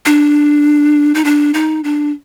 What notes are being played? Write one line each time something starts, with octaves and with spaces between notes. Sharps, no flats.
D4
D#4
D4
D#4
D4